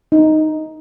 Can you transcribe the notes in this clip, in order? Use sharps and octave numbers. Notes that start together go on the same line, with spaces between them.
D#4